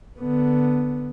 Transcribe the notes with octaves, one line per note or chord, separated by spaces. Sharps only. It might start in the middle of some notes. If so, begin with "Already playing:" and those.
D3 B3